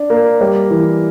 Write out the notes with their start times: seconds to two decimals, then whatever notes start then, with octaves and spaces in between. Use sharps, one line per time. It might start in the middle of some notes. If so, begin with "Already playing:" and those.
Already playing: D4
0.10 A#3
0.41 G3
0.71 E3